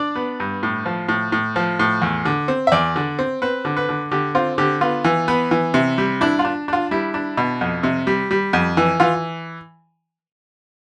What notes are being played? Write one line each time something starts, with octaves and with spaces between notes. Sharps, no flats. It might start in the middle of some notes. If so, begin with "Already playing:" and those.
Already playing: D4 D5
B3
G2
A2
F3
A2
A2
F3
A2
E2
D3
C4
E5
E2 D5
D3
C4
C4 B4
D3
B4
D3
D3 G4
C4 F4
D3 G4
B3 F4
E3
B3
E3
C3
G3
D4 E4
F4
D4
D4 F4
G3 E4
D4
B2
F2
C3
G3
G3
F2
E3
E3 F4